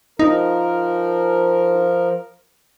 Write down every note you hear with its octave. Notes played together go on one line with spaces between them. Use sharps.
F3 D#4 A#4